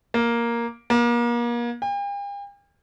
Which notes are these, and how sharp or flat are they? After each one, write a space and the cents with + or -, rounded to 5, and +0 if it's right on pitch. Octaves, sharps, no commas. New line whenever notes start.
A#3 +5
A#3 +35
G5 +45